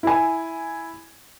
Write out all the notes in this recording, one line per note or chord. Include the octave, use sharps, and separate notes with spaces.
E4 G#5